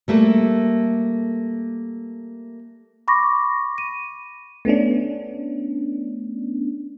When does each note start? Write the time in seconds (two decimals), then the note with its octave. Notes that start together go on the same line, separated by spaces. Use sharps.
0.08 G3 A3 A#3 A4
3.08 B5 C#6 D6 A#6
3.78 D#7
4.65 A3 B3 C#4 D4